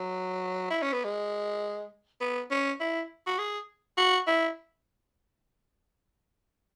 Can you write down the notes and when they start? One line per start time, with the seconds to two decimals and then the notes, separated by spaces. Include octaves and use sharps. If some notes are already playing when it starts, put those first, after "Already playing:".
Already playing: F#3
0.70 E4
0.82 C#4
0.93 B3
1.04 G#3
2.21 B3
2.51 C#4
2.80 E4
3.27 F#4
3.38 G#4
3.97 F#4
4.27 E4